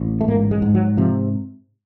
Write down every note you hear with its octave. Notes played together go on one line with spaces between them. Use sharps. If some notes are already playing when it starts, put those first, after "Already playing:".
Already playing: A1
A3
G#2 A#3
G#3
G#2
F#3
C3 F3